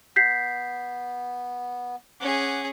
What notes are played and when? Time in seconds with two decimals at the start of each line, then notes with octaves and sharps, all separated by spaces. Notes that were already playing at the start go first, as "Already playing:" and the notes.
0.16 B3 G6 B6 C7
2.20 C#4 G#4 F#5 D6